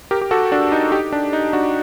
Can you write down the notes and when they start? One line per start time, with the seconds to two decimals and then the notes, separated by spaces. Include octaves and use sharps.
0.11 G4 A#4
0.21 G4
0.31 F#4 A4
0.52 D4 F#4
0.72 D#4
0.92 D#4 G4
1.12 D4
1.33 D#4
1.53 D4 F#4